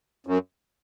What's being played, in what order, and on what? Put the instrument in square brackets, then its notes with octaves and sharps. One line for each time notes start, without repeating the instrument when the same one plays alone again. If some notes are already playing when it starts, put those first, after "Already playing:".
[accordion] F#2